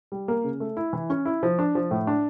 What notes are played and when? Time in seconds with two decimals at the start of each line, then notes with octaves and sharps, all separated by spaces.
0.12 G3
0.28 A#3
0.44 C#3
0.60 A3
0.77 E4
0.93 E3
1.10 C#4
1.25 E4
1.43 F3
1.59 D4
1.75 F3
1.91 A2
2.07 D4